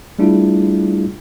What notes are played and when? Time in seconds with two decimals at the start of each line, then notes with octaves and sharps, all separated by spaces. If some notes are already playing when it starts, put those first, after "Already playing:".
0.19 G3 A3 D4 E4 F4 G#4